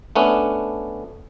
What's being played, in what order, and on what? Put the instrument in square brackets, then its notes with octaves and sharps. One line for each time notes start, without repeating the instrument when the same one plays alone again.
[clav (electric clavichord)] A3 B3 C#4 D4